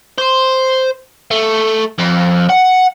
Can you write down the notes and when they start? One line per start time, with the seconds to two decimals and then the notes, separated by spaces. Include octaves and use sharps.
0.18 C5
1.31 A3
1.98 F2
2.49 F#5